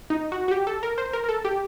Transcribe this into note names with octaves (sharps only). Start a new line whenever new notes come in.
D#4
F#4
F#4
G4
A4
A#4
C5
A#4
A#4
A4
G4